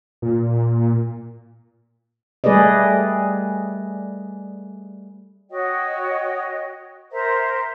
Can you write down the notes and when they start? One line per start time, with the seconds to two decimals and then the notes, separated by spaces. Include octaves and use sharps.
0.22 A#2
2.44 G3 A3 G#4 B4 D5 D#5
5.51 F#4 C#5 D#5 G5
7.12 A#4 C5 E5 A#5